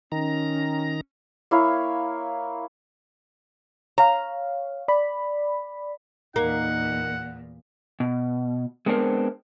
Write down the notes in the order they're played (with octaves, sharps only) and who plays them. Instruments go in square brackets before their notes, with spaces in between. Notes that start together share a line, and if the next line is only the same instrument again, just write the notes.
[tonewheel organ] D#3 A#5 [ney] C#4
[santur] A#3 E4 C#5 F5
[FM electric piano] C#5 F5 [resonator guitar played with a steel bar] A#5
[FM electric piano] D5 B5
[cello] E2 A#2 [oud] A#3 [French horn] D#4 [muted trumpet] F#5
[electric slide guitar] B2
G#3 B3 C4 D4 A#4 C5